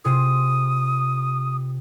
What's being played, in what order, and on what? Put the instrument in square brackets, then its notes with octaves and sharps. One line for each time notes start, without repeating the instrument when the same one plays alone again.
[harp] C3 F4 G#4 [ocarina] D#6